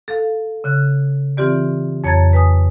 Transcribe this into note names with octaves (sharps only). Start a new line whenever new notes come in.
A4 F5
C#3 F#6
E3 C4 F4 G4 D5
F2 C#5 A5 A#5 G#6 A6
B4 G#5 D#6